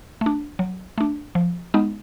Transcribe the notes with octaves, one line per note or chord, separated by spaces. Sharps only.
A3 D4
F#3
A3 D4
F3
G#3 B3 D#4